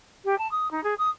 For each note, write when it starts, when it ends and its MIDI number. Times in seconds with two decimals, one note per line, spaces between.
0.25 0.37 67
0.38 0.49 81
0.51 0.70 87
0.71 0.83 63
0.83 0.94 68
0.98 1.09 87